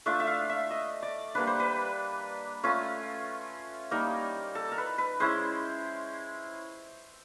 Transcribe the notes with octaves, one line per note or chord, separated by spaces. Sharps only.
A3 D4 F4 E5
E5
F5
E5
D#5
D5
G3 A#3 D4 B4
C5
B4
A3 C#4 F4
G3 A#3 D#4 A#4
A4
A#4
B4
B4
G#3 C#4 E4 C5